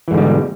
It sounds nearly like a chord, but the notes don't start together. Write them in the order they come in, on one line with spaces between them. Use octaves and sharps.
E3 G#2 D3 G3 B2